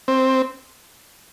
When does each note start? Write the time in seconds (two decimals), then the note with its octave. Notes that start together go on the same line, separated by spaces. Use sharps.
0.08 C4